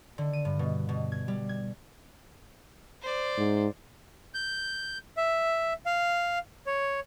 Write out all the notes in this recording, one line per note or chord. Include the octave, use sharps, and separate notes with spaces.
D3
D#7
G2
B2
B2
G#6
G3
G#6
C5 D5
G#2
G6
E5
F5
C#5